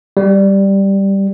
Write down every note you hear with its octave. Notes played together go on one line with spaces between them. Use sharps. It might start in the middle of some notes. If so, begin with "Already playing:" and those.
G3